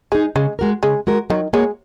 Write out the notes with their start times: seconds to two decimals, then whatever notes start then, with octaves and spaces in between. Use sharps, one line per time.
0.12 G#3 D#4 G#4
0.35 C#3 G#3
0.59 G#3 F#4 A#4
0.83 C#3 G#3
1.07 G#3 F#4 A#4
1.30 D#3 F#3
1.53 G#3 A#3 F#4 C#5